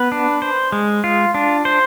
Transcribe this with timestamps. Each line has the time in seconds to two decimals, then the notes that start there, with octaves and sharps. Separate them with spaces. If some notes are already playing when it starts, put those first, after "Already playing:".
Already playing: B3 B4
0.12 D4
0.42 C5
0.72 G#3
1.04 F4
1.34 D4
1.65 C5